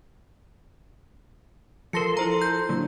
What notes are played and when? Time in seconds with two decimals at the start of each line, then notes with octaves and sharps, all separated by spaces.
1.93 F3 A4 A#4 C6 A#6 C#7
2.17 E4 C5 A#5
2.42 G6
2.69 A#2 D3 F#3